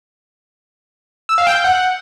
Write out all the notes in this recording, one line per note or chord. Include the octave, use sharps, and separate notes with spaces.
E6
F5
G5
G6
F#5